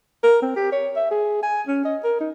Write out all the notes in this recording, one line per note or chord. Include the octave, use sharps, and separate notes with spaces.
A#4
C4
G4
C#5
E5
G#4
G#5
C#4
D#5
A#4
D#4